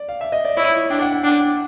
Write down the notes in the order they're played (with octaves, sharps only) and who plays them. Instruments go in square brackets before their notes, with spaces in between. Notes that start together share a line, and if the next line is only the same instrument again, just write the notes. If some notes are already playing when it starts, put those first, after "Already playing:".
Already playing: [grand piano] D5
F5
E5
D#5
D5
[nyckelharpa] E4 [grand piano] C#5
[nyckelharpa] D4 [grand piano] G5
[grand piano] F#5
G5
[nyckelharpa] D4 [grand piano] G5